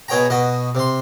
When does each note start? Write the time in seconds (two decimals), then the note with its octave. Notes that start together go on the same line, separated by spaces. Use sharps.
0.08 B2 G#4 C#5 G5 A#5
0.30 B2 F#4 D#5
0.75 C3 C6